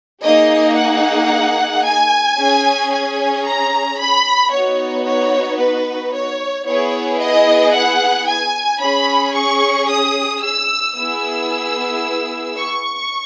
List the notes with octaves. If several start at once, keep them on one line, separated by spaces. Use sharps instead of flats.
A#3 D#4 G#4 D#5
F#5
G#5
C#4 G#4
G#5
A#5
B5
B3 D#4 F#4 C#5
C#5
B4
C#5
B3 E4 G#4 C#5
D#5
F#5
G#5
C#4 G#4 B5
C#6
D#6
E6
B3 E4 G#4 E6
C#6